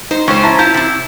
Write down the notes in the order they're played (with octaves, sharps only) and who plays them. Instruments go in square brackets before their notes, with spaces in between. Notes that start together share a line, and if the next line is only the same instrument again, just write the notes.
[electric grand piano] D#4 [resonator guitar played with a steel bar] C5
[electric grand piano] C#2 C#6 [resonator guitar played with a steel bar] C#4 C5
[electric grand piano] E4 A5 A#5
[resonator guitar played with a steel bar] E4 F4 [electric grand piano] G6
[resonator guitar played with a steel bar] C3 E4